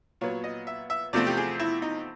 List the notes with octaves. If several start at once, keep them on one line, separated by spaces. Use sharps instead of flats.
A#2 F#3 B3 C#5
D#5
E5
E5
E2 C3 F3 A3 C4 D5
G4
G#4
E4
D#4